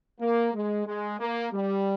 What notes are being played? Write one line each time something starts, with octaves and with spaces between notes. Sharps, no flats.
A#3
G#3
G#3
A#3
G3